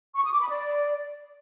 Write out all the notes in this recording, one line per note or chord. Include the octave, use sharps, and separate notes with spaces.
C#6
D#6
D6
B5
D5